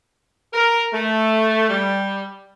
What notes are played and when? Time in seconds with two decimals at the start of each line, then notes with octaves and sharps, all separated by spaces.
0.53 A#4
0.94 A3
1.70 G3